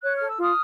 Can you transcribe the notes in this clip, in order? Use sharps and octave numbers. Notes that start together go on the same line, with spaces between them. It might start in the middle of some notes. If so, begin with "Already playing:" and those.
C#5 F#6
F6
A4
E6
F4 D#6 F6